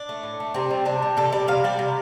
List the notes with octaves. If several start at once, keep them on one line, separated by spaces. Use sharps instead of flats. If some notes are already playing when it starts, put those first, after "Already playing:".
Already playing: D4
A3
A2
A3
C3 C4
G3
C3 D4
G3
C3 A4
G3 D5
C3 F5
G3 D5
C3